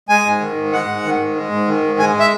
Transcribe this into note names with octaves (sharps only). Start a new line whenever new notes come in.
G#3 G#5
G#2
D#3
G#2
G#3 F#5
G#2
D#3
G#2
G#3
G#2
D#3
G#2
G#3 G#5
E5